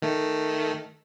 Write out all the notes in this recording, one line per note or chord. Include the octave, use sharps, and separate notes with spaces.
D#3 A3